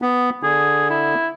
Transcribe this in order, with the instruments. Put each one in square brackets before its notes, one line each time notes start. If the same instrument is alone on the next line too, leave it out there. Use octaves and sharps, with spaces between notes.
[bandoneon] B3
[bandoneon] D3 [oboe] G#4
[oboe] E4